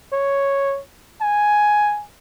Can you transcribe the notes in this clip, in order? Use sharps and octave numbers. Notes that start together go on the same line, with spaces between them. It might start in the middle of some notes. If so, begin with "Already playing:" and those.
C#5
G#5